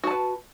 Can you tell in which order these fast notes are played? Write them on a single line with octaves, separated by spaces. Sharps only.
F#4 A5 B4